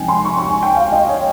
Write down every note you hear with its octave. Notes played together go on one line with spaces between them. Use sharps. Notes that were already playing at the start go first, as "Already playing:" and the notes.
Already playing: C#2 C3 F3 C4 D#4 G5 G#5
C6
C#6
C#6
G#5
G5
F5
D#5
C#5